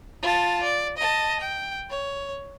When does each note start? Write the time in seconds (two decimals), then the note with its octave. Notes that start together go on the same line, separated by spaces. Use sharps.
0.23 F4 A5
0.63 D5
0.97 D#5 A5
1.41 G5
1.90 C#5